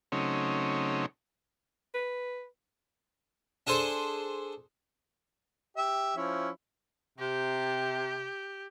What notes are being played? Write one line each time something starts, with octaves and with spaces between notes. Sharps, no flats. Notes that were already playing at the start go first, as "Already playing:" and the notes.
C#3 F#3 A3 C4 C#4 D#4
B4
D4 G#4 A4 C5
G4 E5
F3 C#4 E4
C3 G4